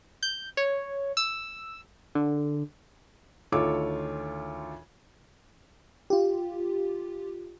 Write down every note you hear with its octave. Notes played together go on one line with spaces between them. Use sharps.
G6
C#5
E6
D3
D2 D#3 F4 A4 C#5 D6
F4 G4